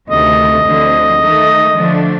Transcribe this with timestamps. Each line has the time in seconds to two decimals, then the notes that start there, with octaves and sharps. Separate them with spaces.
0.10 D2 C3 D#3 A3 D#5
0.65 D2 D3 F3 C4
1.21 D#3 A3 D#4
1.76 D3 F3 A3 D4